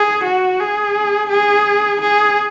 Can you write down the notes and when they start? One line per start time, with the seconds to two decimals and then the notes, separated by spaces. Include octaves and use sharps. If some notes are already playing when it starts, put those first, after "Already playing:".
Already playing: G#4
0.24 F#4
0.60 G#4
1.30 G#4
2.01 G#4